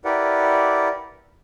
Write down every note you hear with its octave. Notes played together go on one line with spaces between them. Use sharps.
E4 G4 A#4 B4 D5 F#5